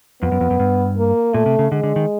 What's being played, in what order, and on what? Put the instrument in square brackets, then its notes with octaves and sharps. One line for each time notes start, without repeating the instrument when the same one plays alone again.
[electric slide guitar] F2 [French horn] B3
[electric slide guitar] F#2
F2
F#2
G2
[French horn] A#3
[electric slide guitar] A#2 [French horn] A3
[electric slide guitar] C3
C#3
[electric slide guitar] D3 [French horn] G#3
[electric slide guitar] D3
D#3